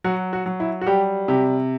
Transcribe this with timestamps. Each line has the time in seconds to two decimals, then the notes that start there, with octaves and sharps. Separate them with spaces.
0.04 F#3 F#4
0.33 F#4
0.46 F#3
0.60 E4
0.81 F#4
0.87 G3 G4
1.28 C3 G4